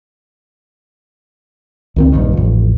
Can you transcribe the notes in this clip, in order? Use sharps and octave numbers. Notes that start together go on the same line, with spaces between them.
C#2 D#3 C4
A#1 G2 D#3
A1 F2